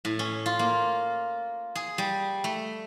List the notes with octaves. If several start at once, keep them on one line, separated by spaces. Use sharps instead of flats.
A2
C#4
F4
A#3
G#4
G3
A3